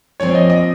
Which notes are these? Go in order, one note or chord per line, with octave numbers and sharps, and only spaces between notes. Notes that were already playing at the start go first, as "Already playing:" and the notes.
A#2 F3 C4 C#5
D#5
D#5